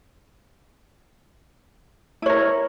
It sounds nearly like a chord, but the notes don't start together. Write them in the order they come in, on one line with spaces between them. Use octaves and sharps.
E4 C#5 A#4